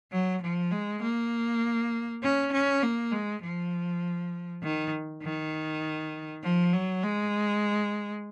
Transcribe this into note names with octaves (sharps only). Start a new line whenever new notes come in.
F#3
F3
G#3
A#3
C#4
C#4
A#3
G#3
F3
D#3
D#3
F3
F#3
G#3